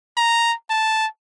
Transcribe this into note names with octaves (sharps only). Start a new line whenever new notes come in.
A#5
A5